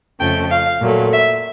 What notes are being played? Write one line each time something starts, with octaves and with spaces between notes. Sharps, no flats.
F2 C#3 F3 A3 G5
F5
A#2 F#3 A3
E5